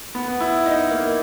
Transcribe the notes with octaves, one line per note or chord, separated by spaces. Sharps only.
B3
E4
D#4
A#3